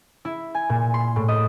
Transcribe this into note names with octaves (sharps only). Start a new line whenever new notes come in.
E4
G#5
A#2
C6
A2
D#5